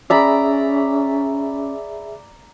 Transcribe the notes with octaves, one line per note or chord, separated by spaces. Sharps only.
C#4 G#4 D5 E5 A#5 B5